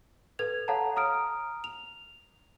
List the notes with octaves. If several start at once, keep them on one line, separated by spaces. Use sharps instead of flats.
A4 B4 G#6 F7
A4 C#5 F5 F#5 A5 A#5
A#5 D#6 F6 D7
F7